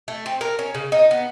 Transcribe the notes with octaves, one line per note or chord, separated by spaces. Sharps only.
A3
C4
A#4
C#4
C#3
D#4
B3